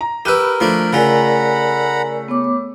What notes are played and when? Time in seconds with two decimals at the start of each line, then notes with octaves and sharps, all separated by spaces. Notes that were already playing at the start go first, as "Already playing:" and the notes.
0.01 A#5
0.25 G4 A#4 B4 B5 E6 F#6 D#7
0.61 F3 A3 D4
0.93 C#3 F4 A#4 D5 F#5 G#5 A#5 B5
2.28 B3 C#5 D6